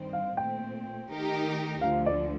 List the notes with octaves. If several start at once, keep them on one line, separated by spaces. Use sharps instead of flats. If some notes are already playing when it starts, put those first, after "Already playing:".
Already playing: G2 D#3 G3 C4
F5
A#2 A3 C4 G5
D#3 A3 D#4 G4 A#4
D2 D3 F3 F5
D5